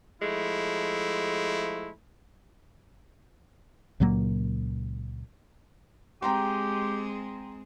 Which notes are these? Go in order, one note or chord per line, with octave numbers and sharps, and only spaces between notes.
F3 G#3 A3 E4
C#2 A#2 F#3 A#3
G#3 C4 G4 G#4 G5 A#5 C6